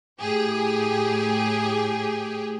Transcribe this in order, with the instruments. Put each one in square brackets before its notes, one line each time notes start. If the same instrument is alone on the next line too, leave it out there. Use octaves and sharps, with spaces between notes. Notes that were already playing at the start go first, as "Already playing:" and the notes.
[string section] A2 G4 G#4